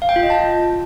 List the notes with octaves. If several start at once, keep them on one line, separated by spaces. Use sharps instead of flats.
F5
G5
F4
D#5
A5